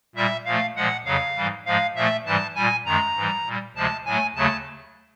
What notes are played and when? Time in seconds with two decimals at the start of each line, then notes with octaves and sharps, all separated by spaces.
0.16 A#2 G3 E5
0.45 A#2 F3 A3 F5
0.76 A#2 F3 G#3 F#5
1.05 F2 C#3 F#3 F5
1.36 G#2 E3 G3
1.66 G#2 F3 G#3 F5
1.95 A#2 F3 A3 E5
2.26 G#2 E3 G3 A5
2.55 A#2 G3 G#5
2.85 F#2 D#3 G#3 A#5
3.16 G#2 E3 G3
3.46 A#2 G3
3.76 D2 C3 F3 G#3 A5
4.05 A2 F#3 A3 G#5
4.36 D#2 C#3 F#3 A3 A5